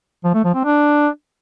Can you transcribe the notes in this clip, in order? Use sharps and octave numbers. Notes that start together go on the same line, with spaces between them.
F3
A3
F3
C4
D4